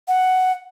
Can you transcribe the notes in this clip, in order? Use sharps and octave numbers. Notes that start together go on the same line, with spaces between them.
F#5